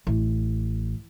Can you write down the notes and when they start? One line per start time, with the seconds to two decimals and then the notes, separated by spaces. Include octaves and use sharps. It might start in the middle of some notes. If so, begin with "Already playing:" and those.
0.07 A1